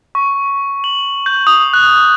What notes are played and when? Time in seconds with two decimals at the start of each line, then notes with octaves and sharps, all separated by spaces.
0.15 C#6
0.84 F#7
1.26 G6
1.47 D#6
1.74 F#6